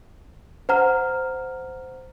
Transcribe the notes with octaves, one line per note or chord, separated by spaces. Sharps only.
C5 F#5 A#5 F6